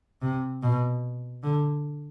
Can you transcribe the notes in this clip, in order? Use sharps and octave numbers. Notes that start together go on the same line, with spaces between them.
C3
B2
D3